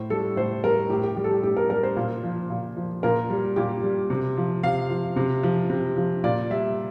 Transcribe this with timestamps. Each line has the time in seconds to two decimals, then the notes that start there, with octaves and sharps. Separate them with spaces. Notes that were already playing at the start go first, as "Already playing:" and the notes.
Already playing: A2 C5
0.10 G3 A4
0.36 A2 C5
0.64 G3 A#4
0.89 A2 G4
1.03 G4
1.16 G3 G4
1.24 A4
1.31 G4
1.43 A2 G4
1.57 A#4
1.70 G3 A#4
1.83 C5
1.96 A#2
2.23 F3
2.50 A#2
2.77 F3
3.03 A#2 A#4
3.30 G3
3.56 A#2 G4
3.84 G3
4.10 C3
4.37 F3
4.63 C3 F5
4.90 F3
5.16 C3
5.43 F3
5.70 C3
5.97 F3
6.24 A#2 D5
6.50 G3 E5